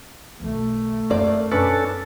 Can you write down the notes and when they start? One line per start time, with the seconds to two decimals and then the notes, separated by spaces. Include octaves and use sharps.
0.40 B1 D#3 A3
1.10 F#2 A#3 C4 A#4 D5
1.52 F#2 C#4 D4 A4 B4